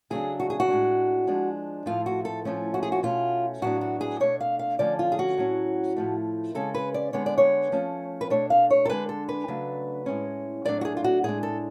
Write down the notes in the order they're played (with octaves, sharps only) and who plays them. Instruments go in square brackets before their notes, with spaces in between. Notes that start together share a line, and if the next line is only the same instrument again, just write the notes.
[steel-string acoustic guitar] C#3 F#3 A3 D4 G#4
F#4
G#4
F#4
A2 G#3 D4
F3 G#3 D4
A2 F3 A3 F4
F#4
A4
A2 F3 A3 C#4
F#4
G#4
F#4
B2 A3 C#4 F4
A2 F#3 B3 D4 F#4
F#4
G#4
B2 A3 D4 C#5
F5
F5
D3 F3 A3 C#4 D5
F4
G#4
F#4
A2 F#3 C#4
A2 F3 A3
C#3 G#3 C#4 A4
B4
D5
D3 G#3 B3 C#5
D5
C#5
F3 A3 C#4
B4
B2 A3 D4 C#5
F5
C#5
A4
D3 G#3 D4 B4
A4
B4
C#3 F#3 A3 D4
A2 G#3 C#4
A2 F#3 A3 D4 D5
F#4
G#4
F4
F#4
A2 G#3 D4 G#4
A4